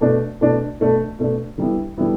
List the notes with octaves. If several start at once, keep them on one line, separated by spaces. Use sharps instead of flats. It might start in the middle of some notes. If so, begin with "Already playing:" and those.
B2 A3 D4
B2 A3 D4
B2 A3 D4
B2 A3 D4
D3 G3 B3 E4
D3 G3 B3 E4